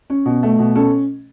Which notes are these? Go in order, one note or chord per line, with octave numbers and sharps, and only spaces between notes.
C#4
B2
A3
B2
C#4 A4